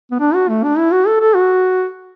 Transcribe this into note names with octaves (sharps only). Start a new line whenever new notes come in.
B3
D4
F#4
A3
D4
E4
F#4
A4
A4
F#4